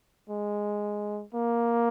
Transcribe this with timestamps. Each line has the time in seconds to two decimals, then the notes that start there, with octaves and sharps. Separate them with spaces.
0.29 G#3
1.34 A#3